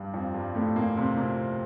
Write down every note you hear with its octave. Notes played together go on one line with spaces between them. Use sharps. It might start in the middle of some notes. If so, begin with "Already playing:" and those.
Already playing: G2 G3
F2 F3
G2 G3
A2 A3
A#2 A#3
C3 C4
A#2 A#3